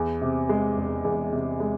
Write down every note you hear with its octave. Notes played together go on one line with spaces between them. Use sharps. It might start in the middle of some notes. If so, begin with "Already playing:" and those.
Already playing: E2
C3
G#3
E1
E2
C3
G#3